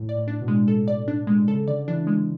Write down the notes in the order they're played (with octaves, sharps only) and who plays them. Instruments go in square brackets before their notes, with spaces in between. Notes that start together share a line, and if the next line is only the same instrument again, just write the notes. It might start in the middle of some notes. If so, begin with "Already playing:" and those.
Already playing: [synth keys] A2
[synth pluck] D5
[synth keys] A2
[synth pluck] D4
[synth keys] B2
[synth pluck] G#3
A4
D5
D4
G#3
[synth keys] C#3 [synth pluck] A4
[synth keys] D3 [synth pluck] D5
[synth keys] E3 [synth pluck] D4
[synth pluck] G#3